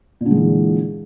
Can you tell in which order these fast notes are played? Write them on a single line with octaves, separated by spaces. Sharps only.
A#2 D3 G#3 E3